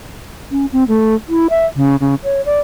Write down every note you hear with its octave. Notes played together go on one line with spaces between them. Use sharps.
C#4
C4
A3
E4
E5
C#3
C#3
C#5
D5